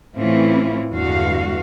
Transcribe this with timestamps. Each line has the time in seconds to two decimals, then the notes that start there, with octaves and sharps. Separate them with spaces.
0.17 A2 E3 C4 C#4 E4 F4
0.94 E2 G2 D3 G#3 F#4 F5